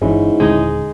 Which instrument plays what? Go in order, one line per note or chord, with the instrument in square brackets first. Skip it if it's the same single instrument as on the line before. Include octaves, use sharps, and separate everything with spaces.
[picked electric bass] G1 E3 [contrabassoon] G#2 [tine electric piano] C#4 E4
[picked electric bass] D#1 D3 C4 [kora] G#3 D#4